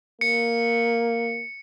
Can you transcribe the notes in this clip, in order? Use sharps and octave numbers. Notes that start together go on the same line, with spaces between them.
A#3 C#7